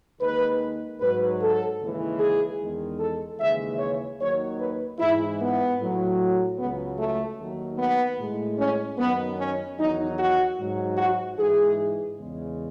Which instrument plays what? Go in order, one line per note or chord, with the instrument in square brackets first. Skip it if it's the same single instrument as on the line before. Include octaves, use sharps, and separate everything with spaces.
[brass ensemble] D#2 D#3 G#3 B4
G#2 F#3 B4
A4
D#2 C#3 E3 G#3
G#4
E2 D#3 G#3
A4
D#2 C#3 E3 G#3 E5
C#5
D#2 D#3 F#3 C#5
B4
G#2 E3 G#3 E4
B3
A2 F#3
C#2 C#3 F#3 B3
A3
D#2 D#3 F#3
B3
A2 G#3
C#4
F#2 D#3 F#3 B3
C#4
E2 D#3 F#3 D#4
F#4
G#2 F#3
F#4
G#2 E3 G#3 G#4
E2 C#3 G#3